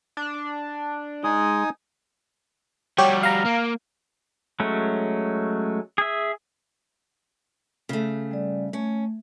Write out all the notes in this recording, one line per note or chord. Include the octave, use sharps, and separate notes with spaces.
D4
G#3 D#4 G#5 D#6
G3 F#4 G4 C#5
F5 A#5
A#3
F#3 G#3 A3 C#4
G#4 E5
C#3 A3
G3 D5
A3 C#4